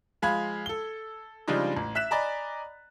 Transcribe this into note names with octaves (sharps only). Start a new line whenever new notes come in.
F3 G#3 F5 B5 G#6
A4 G7
C#3 F3 G3 G#3 D4 D#4
A1
E5 F#6 B6 E7
D5 D#5 G#5 A#5 B5